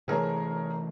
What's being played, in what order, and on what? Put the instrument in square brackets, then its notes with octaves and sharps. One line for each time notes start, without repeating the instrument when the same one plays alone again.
[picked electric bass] C3 E3 A3 [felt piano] G#4 A#4 C#5